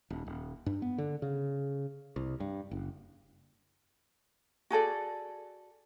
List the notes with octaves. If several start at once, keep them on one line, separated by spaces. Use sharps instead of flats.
D#1
D#1
G2
B3
D3
C#3
C2
G2
F#1
F#4 G#4 A4 D5